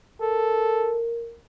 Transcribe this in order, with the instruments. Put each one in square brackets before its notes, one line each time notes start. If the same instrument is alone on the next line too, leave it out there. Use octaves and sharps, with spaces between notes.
[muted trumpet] A4 [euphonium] A#4